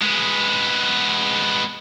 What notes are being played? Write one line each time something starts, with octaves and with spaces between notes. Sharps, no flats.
G#3 B3